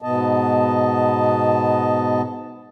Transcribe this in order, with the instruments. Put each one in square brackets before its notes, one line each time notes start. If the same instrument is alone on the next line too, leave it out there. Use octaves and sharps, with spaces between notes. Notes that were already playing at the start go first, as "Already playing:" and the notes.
[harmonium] G#2 B2 B3 D#5 A5